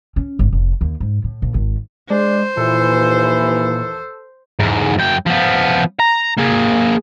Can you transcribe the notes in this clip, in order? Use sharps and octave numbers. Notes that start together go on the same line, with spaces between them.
C#4
G1
F1
D#2
G#2
A2
A#1
G#1
G#3 D4 C5
D#2 A#2 E3 A4
E2 G#2
F#2 G5
F3 B3
A#5
A#3 G#4